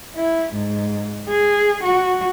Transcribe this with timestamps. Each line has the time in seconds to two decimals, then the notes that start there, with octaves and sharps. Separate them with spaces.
0.17 E4
0.54 G#2
1.29 G#4
1.83 F#4